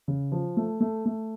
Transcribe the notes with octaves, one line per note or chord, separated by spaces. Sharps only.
C#3
F3
A3
A3
A3